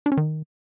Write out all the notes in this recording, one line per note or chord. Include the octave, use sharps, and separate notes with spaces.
D4
C#4
D#3